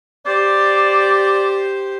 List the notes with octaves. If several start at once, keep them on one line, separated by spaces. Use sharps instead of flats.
G4 C5 D5